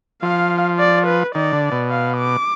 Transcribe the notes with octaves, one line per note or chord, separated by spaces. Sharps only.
F3 F5
D5
B4
D#3 D5
D3
B2
F5
D6